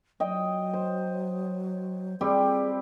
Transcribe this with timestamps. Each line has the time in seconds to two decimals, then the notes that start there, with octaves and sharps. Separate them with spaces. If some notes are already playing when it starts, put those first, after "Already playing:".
0.20 F#3 D#5 G5
0.74 C5
2.21 G3 C4 G4 G#4